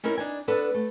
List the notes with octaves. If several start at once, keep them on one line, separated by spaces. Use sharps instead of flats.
C#4 D#4 E4 A#4
D4 D#4 G#5
B3 D4 A4 B4
A3